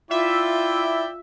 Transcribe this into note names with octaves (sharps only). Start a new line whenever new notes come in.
E4 F4 D5 E5 G5